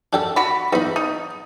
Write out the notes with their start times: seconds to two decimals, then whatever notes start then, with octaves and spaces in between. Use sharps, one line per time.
0.13 D4 G4 A4
0.36 F#4 B5
0.73 E2 D#4 B5
0.96 D#4